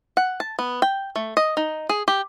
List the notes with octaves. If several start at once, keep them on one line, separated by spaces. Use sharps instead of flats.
F#5
A5
B3
G5
A3
D#5
D#4
G#4
G4